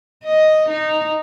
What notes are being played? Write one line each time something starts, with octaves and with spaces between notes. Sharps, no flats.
D#5
D#4